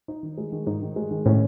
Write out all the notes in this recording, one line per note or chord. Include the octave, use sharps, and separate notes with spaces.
D#4
D#3
G#3
D#3
G#2 D#4
D#3
G#3
D#3
A2 C#4